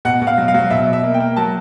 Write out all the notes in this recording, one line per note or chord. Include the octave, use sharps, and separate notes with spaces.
B2 F#5
B2
F5
F#3
F5
F#3
B2 E5
B2
E5
A#3
G5
A#3
F#3 A5